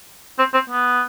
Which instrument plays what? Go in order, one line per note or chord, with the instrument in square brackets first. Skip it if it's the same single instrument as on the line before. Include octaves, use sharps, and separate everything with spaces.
[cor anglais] C4
C4
B3